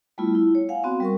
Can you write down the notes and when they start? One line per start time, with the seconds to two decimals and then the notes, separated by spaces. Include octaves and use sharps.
0.18 G3 A3 B3 E4 F4
0.35 E4
0.55 C#5
0.69 F5 F#5 G#5
0.84 B3 C4 F#4
1.00 G3 A#4 C#6